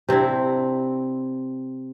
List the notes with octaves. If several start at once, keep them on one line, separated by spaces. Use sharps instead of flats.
C3 C4 D4 E4